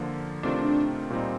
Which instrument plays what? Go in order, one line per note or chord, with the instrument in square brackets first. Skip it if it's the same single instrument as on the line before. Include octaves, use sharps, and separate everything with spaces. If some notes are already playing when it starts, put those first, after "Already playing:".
Already playing: [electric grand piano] D3 F3 A#3 F4 A4
[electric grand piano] C3 D#3 A3 C4 F4 [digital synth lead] D4
[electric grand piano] A#2 G3 C4 D#4